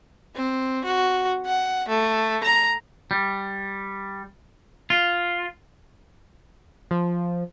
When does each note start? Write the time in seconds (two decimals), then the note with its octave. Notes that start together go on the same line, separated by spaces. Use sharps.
0.35 C4
0.85 F#4
1.46 F#5
1.88 A3
2.44 A#5
3.11 G3
4.90 F4
6.91 F3